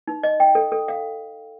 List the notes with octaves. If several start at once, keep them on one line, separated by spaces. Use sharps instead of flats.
D#4
D#5
G5
A4
A4
F5